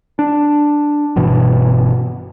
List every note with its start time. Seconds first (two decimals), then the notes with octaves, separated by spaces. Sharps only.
0.19 D4
1.16 G1 B2 E3